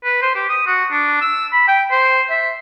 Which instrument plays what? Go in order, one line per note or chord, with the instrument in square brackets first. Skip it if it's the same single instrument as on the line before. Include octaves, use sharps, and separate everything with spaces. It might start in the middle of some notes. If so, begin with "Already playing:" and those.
[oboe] B4
C5
G4
D#6
F#4
D4
E6
B5
G5
C5
E5